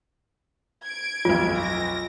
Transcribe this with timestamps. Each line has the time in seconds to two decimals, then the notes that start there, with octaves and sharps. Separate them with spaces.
0.85 G#6 D7
1.25 B1 F2 F4
1.60 A#6